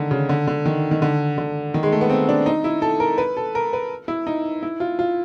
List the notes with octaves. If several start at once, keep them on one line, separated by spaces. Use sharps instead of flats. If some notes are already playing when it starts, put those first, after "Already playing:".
Already playing: D3 D#3
C#3
D3
D3
D#3
D#3
D3
D3
D#3
G#3
A3
B3
C4
D4
D#4
E4
A4
A#4
B4
A4
A#4
B4
E4
D#4
E4
F4
F4